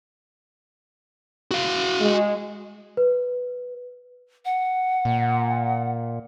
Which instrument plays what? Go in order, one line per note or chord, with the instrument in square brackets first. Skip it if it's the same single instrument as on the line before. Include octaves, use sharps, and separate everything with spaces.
[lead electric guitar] F#4 F5
[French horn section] G#3
[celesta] B4
[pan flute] F#5
[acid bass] A#2